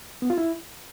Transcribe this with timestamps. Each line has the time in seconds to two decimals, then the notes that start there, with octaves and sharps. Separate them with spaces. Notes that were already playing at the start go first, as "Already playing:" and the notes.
0.22 B3
0.30 F4
0.38 E4